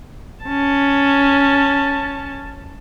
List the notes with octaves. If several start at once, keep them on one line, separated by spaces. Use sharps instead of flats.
C#4 A5